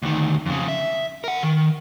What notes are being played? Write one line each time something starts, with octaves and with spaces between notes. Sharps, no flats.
D2 D#3
F2 C#3
E5
A#4 F#5
D#3